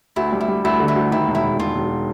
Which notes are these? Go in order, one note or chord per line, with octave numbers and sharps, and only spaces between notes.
D2 E4
G3
E4
G3
D2 E4
D3
E4
D2
D#3 E4
E1
E4
E1
E1 F4
E1